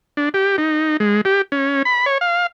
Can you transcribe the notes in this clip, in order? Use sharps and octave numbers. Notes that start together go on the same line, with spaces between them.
D4
G4
D#4
G#3
G4
C#4
B5
C#5
F5